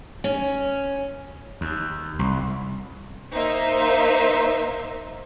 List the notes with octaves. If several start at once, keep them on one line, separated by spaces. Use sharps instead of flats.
C#4
D#2
C2
A#3 D#4 C5 E5